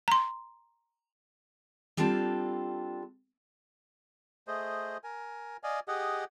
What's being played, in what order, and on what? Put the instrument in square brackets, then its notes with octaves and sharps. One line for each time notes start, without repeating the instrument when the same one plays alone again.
[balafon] A#5 C6
[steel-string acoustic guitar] G3 C4 D4 F4 A4
[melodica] A3 G#4 C5 D#5
A#4 G#5
D5 D#5 F5 G#5
G4 G#4 D#5 F#5